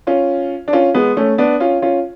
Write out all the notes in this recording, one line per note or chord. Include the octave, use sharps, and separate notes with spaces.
C#4 F4
D4
C#4 F4
G#3 B3
A3 C#4
B3 D4
C#4 F4
C#4 F4